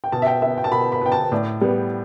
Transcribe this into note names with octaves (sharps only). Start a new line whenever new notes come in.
G5
B2 A5
E5
G5
B3 E5
G5
A5
B2 B5
B5
B3 G5
A5
A2 D5
G3 B3